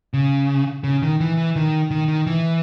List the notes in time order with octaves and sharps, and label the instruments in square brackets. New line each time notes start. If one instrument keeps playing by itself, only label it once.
[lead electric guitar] C#3
C#3
D#3
E3
E3
D#3
D#3
D#3
E3